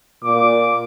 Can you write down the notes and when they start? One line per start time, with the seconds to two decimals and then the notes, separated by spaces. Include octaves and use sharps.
0.24 A#2 D6